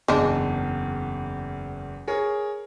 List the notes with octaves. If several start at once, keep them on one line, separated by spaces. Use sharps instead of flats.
F#1 E2 G#3 D4
G#4 A#4 C#5